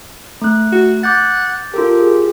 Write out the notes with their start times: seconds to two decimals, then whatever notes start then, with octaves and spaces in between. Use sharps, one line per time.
0.42 A3 F#6
0.73 F#4
1.03 F#5 D6 G6 A6
1.74 F4 G4 A4 A#4
2.00 G#4